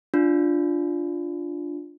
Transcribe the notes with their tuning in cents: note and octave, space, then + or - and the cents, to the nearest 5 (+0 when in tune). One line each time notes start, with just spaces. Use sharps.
D4 +0 F4 +0